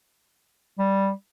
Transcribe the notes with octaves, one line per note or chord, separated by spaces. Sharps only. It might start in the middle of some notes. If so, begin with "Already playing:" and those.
G3